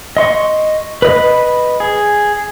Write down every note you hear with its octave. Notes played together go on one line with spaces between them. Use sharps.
D#5 C6 C#6
B4 D#5 B5
G#4